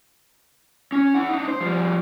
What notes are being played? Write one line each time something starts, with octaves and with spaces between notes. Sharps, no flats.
C#4
E4 F#5
D4 D#4
C5
F3 G3